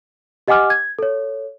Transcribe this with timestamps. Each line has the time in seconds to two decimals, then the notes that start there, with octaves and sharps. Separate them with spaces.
0.48 G4 D#5 F#5 G#5 D6 F6
0.70 G#6
0.99 A4 C#5